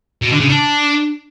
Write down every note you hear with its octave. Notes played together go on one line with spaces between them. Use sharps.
B2
D3
C#3
D4